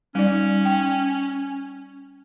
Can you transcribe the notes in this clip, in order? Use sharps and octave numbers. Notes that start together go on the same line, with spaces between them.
G3 C#4 D#4 D5
G5